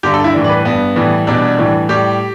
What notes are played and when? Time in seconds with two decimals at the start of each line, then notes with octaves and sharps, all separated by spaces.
0.03 G2 D3 G3 G4
0.14 A4
0.24 E4
0.34 A2 E3 G3
0.44 D5
0.49 B4
0.65 G2 G3 B3
0.96 A2 E3 G3
1.27 E2 B2 G3 D4
1.58 A2 E3 G3
1.89 A2 G3 G4